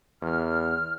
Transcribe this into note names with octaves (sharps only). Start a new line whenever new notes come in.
E2 F6